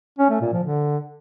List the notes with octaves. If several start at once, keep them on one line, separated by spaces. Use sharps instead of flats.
C#4
A3
A#2
F3
D3